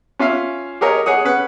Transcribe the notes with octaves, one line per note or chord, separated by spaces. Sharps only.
C#4 F4 E5 F5
G4 G#4 A#4 C#5 D#5
G#4 C#5 F#5 D#6
C#4 B4 F#5